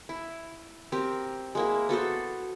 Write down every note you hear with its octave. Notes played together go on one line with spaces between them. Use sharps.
E4
C4 G4 A#4
G#3 A#3 E4
B3 F#4 A4 C5